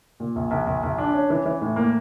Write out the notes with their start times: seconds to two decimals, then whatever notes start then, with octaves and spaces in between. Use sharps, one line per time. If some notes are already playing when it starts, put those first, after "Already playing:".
0.20 A#2
0.36 A#1
0.51 A#1
0.67 A#1
0.83 A#1
0.98 D4
1.14 C#4
1.30 E3
1.45 E3
1.61 A2
1.76 A#3